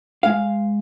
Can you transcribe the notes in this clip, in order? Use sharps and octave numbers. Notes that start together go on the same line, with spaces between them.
G#3 F5